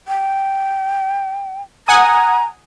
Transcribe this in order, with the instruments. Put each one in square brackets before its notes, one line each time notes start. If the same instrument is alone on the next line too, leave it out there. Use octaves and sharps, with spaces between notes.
[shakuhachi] G5
[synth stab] F#5 G#5 D#6 [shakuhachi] A#5